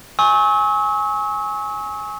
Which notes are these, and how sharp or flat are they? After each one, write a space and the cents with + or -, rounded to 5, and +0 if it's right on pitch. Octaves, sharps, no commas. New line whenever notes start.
G#5 +0 C#6 -15 E6 -40